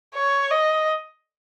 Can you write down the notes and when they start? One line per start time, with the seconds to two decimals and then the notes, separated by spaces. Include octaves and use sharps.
0.15 C#5
0.51 D#5